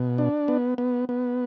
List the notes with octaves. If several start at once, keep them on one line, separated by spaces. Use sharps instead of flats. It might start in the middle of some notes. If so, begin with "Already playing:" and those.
Already playing: B2
D4
B3
B3
B3